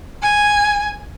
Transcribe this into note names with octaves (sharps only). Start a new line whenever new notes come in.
G#5